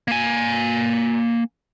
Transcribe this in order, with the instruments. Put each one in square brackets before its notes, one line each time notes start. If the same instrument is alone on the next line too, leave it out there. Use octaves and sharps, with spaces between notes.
[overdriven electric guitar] A#3 G#5